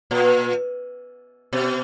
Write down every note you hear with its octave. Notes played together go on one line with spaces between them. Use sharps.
A#2
B2